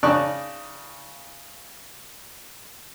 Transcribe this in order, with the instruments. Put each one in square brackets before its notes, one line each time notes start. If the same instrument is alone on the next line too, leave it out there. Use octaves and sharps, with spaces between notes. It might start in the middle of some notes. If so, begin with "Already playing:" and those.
[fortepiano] C#3 D#4 D5 A5 C#6 F#6